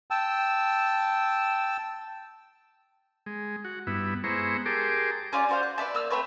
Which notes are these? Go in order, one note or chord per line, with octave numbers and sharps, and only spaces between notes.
G5 A5 E6
G#3
F#4
G2 B3 E4
G#3 B3 E4 C5 A#5 C#6
G4 G#4 A#4 A5 C6 D6
C#4 F4 D5
F#4 C5 F5
F#6
B4 D5 E5 A5
A#3 E6 F6
A3 C4 B4 C#5